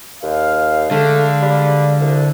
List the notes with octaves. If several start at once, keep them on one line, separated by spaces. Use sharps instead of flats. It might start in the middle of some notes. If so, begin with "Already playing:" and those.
D#2 F5
D3 G#3 A3
G3
C2